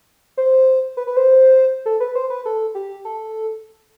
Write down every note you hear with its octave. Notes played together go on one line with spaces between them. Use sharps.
C5
B4
B4
C5
A4
B4
C5
B4
A4
G4
A4